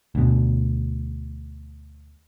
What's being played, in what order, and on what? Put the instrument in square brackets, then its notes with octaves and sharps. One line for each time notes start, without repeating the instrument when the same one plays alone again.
[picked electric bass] D2 B2